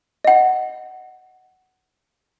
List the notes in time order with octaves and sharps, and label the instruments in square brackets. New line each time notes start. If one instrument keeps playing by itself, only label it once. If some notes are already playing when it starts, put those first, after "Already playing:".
[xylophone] D#5 F#5